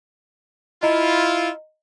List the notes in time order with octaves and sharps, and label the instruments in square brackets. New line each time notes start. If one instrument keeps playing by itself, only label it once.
[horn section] E4 F4 [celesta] D#5 A#5